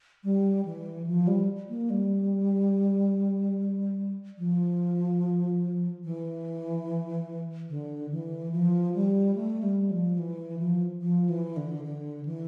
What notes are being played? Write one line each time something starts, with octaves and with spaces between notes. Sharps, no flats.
G3
E3
F3
G3
A#3
G3
F3
E3
D3
E3
F3
G3
A3
G3
F3
E3
F3
F3
E3
D3
D3
E3